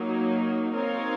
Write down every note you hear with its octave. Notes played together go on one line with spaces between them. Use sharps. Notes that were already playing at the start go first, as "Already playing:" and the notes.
Already playing: F#3 A#3 D#4 A#4
C4 D#4 A#4 C#5 F5